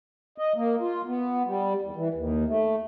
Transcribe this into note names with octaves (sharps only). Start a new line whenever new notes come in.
D#5
A#3
F4
B3
G3
E2
E3
D#2
A3